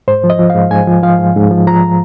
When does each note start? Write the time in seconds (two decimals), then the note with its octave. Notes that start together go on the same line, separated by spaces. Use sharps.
0.08 G#2 C5
0.24 F3
0.30 D#5
0.39 F3
0.50 F5
0.55 G#2
0.71 G#2 G#5
0.87 F3
1.03 F3 F5
1.19 G#2
1.36 G#2
1.51 F3
1.67 F3 A#5